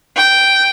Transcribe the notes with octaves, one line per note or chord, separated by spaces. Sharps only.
G5